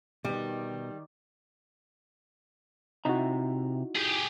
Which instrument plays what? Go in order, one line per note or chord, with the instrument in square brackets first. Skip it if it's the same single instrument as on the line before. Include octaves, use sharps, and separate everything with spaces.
[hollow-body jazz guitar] B2 B3 [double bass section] D#3 [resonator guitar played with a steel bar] G3
[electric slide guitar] C3 A#5 [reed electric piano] D#4 E4 F#4
[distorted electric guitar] G4 G#4